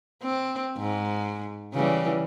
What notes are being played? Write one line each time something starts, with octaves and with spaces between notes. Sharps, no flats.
C4
G#2
C#3 E3 G3